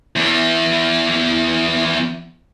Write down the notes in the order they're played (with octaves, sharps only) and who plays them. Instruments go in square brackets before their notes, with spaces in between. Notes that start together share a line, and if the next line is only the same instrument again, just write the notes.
[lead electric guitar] E2 E3